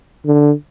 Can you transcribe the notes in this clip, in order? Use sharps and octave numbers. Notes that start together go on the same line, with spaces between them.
D3